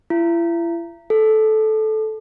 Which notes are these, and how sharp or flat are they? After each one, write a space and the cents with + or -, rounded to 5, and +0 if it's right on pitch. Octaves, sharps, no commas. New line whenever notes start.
E4 +40
A4 -15